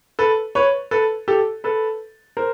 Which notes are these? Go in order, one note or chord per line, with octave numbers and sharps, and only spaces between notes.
A4 B4
B4 C#5
A4 B4
G4 A4
A4 B4
A#4 C5